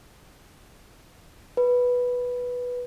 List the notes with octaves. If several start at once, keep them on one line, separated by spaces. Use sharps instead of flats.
B4